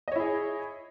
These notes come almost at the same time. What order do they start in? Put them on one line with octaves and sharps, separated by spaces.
D#5 C#5 E4 G#4